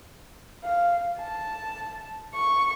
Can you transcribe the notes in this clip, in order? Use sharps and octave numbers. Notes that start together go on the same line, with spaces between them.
F5
A5
C#6